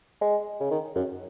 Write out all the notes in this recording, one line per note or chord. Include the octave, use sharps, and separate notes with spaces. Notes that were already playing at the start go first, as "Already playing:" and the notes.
G#3
C#3
D#3
F#2